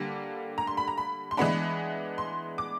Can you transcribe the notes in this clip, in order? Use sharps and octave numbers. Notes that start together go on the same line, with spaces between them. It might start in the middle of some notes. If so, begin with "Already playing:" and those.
Already playing: D3 G3 A#3
A#5
C6
B5
A#5
B5
C6
E3 G#3 B3 D4 B5
C6
D6